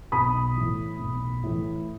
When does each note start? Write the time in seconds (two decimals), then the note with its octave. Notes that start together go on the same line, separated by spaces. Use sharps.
0.12 B1 B5 D#6
0.56 A2 E3
0.99 B1
1.43 A2 E3